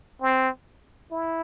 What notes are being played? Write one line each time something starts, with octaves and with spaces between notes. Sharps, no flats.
C4
E4